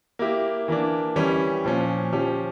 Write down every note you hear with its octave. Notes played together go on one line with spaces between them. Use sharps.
A#3 E4 G4
E3 A#3 D4
E3 G3 C#4
A#2 F3 C#4
F3 C#4 G4